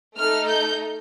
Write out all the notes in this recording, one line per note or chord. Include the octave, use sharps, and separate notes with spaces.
A3 D#4 A4 F6
G6